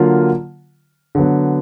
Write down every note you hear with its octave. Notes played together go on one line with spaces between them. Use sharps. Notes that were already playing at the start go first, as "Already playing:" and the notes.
Already playing: D3 F#3 A#3 F4
D3 F#3 B3